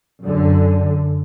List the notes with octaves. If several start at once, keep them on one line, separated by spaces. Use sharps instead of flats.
F#2 D3